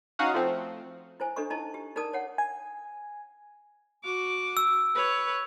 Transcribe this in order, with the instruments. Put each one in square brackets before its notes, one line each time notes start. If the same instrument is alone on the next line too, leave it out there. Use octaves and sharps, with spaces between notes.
[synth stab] C#4 D#4 F#4 F5 F#5 D#6
F3 A3 C4
[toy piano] E4 C5 G#5
D4 A4 D#5 C#6
D#4 E4 D#5 A5
G4
D#4 G#4 A#4 D5 A5 D#6
C#5 F#5
[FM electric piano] G#5
[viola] F#4 D6
[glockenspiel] E6
[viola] B4 C#5